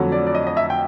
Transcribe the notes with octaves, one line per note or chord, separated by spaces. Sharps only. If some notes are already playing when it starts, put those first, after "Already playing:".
Already playing: F2 D3 F#3 A3
D5
D5
D#5
D#5
E5
G5